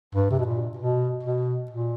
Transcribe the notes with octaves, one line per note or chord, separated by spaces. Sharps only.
G2
C3
B2
A#2
B2
B2
A#2